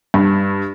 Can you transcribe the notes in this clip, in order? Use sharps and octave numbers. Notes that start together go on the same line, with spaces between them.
G2